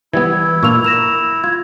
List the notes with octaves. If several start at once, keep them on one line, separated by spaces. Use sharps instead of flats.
E3 G3 B3 E4 G#6
A#2 D4 F4 C#6 E6 F7
A#4 A#6 E7 F7
F4 G#6